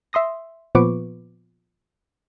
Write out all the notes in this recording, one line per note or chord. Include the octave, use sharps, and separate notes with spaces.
E5 C6 D#6 A#6
A#2 F3 B3 B4 C#6 D6